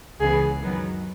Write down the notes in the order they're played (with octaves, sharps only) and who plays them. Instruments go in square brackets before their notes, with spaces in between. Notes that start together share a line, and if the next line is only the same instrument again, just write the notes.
[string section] C#2 C#3 E3 B3 [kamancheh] G#4
[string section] F#2 D#3 F#3 B3